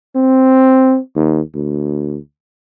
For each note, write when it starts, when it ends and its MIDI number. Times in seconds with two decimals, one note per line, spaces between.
0.16 0.98 60
1.15 1.41 39
1.55 2.18 38